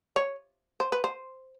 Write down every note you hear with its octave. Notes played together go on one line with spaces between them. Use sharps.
C#5
C5
B4
C5